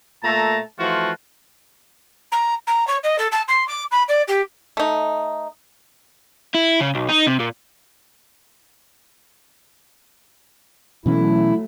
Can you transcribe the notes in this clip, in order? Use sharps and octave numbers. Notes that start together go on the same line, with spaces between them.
A#2 A3 A4 A5 A#5
E3 F3 A3 F4 F#4
A#5
A#5
C#5
D#5
A4
A5
C6
D6
B5
D5
G4
A3 D#4
E4
C#3
B1
D#4
C3
A#2
B2 E3 F#3 A3 C#4 E4